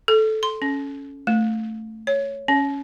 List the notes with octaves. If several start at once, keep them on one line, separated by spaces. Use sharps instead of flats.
A4
C6
C#4
A3
C#5
C#4